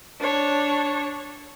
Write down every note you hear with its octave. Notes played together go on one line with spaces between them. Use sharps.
D4 C#5